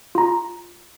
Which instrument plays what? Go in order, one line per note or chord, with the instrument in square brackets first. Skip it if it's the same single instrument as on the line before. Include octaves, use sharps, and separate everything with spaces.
[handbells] F4 A#5